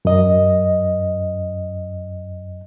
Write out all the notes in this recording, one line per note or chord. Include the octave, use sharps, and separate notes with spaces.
F#2 D#5